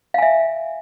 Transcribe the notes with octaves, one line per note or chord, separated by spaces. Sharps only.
E5 F5 G#5